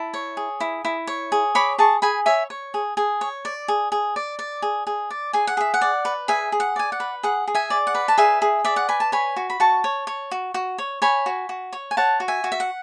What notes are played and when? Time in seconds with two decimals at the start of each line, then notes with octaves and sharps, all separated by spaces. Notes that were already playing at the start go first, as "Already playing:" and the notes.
Already playing: E4 A5
0.14 C#5
0.37 G#4
0.60 E4
0.85 E4
1.07 C#5
1.32 G#4
1.55 C#5 B5 D6
1.78 G#4 A5 C#6
2.02 G#4 G#5 B5
2.26 C#5 E5 G#5
2.50 C#5
2.74 G#4
2.97 G#4
3.21 C#5
3.45 D5
3.68 G#4
3.92 G#4
4.16 D5
4.39 D5
4.62 G#4
4.87 G#4
5.10 D5
5.33 G#4 G#5
5.47 F#5
5.57 G#4 E5
5.74 F#5
5.81 D5
6.05 B4
6.28 G#4 E5 G#5
6.52 G#4
6.60 F#5
6.76 D5 G#5
6.92 F#5
7.00 B4
7.23 G#4 F#5
7.48 G#4
7.55 E5 G#5
7.70 D5
7.87 F#5
7.95 B4
8.08 A5
8.18 G#4 E5 G#5
8.42 G#4
8.65 D5 E5
8.76 F#5
8.89 B4 G#5
9.00 A5
9.12 C#5 G#5 B5
9.36 F#4
9.50 B5
9.60 F#4 A5 C#6
9.84 C#5
10.07 C#5
10.31 F#4
10.54 F#4
10.78 C#5
11.02 C#5 G#5 B5
11.26 F#4
11.49 F#4
11.73 C#5
11.91 G#5
11.97 C#5 F#5 A5
12.20 F#4
12.28 E5 G#5
12.44 F#4
12.52 E5
12.60 F#5